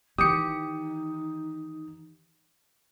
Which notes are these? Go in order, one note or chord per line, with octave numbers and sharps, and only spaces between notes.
D#3 E3 D#4 G4 D#6 C#7